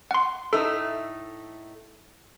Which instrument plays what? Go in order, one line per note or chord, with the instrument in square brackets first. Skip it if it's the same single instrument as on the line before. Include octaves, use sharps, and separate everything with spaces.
[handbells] F#5 C6
[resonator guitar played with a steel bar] A2 A3 D#4 [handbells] A4